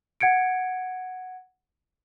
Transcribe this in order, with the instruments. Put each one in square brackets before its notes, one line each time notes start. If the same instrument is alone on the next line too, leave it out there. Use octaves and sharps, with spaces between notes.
[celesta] F#5 G#6 C#7 D7